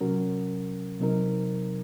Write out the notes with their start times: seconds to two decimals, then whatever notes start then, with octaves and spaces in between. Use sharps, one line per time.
0.01 C3 F#3 C#4 F#4 A#4
1.00 C3 F#3 C4 D#4 A#4